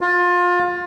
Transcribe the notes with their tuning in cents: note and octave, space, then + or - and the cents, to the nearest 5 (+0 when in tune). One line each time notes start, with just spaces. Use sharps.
F4 +25